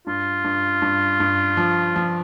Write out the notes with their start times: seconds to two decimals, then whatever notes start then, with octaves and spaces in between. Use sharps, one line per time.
0.07 G2 F4
0.44 G2
0.82 G2
1.20 G2
1.57 F3
1.96 F3